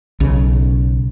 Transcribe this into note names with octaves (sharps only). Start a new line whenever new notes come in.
B1 C#3